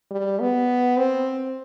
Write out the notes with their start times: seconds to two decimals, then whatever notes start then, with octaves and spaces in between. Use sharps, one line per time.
0.11 G3
0.40 B3
0.97 C4